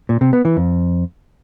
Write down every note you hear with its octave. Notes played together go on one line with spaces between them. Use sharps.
A#2
C3
B3
E3
F2